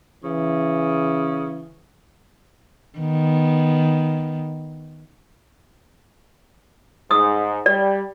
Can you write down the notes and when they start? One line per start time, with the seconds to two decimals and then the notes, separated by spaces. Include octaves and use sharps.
0.24 C#3 E3
2.99 D#3 B3
7.11 G#2 D#6 E6
7.66 G3 D5